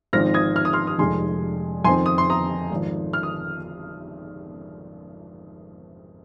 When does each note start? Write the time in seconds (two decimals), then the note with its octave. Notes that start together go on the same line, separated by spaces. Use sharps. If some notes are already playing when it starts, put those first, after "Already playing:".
0.13 G#1 G#2 F3 C4 F6 A#6
0.34 D#6 G#6
0.56 F6
0.65 D#6
0.73 C6 F6
0.87 D#6
0.98 F1 F2 C3 D#3 G#3 G#5 C6
1.84 F2 D#3 C4 G#5 C6
2.06 D#6
2.18 C6
2.30 A#5 D#6
2.71 G#1 G#2 F3
3.13 F6
3.23 D#6